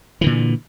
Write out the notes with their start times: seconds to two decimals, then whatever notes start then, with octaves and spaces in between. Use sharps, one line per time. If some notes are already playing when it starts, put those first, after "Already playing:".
0.21 E3
0.24 D3
0.26 A#2